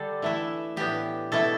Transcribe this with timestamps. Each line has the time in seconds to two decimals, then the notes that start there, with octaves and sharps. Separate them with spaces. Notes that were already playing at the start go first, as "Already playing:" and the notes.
Already playing: D3 G3 D4 A4
0.22 E3 A3 E4
0.76 A2 E3 B3 D4 G4
1.32 B2 A3 E4 A4